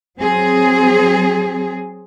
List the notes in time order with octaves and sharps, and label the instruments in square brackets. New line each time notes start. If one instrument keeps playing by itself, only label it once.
[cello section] F#3 C4 G#4